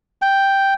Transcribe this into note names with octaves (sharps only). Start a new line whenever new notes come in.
G5